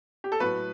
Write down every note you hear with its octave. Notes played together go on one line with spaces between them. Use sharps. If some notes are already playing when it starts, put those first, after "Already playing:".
G4
A4
A2 F#3 A3 B4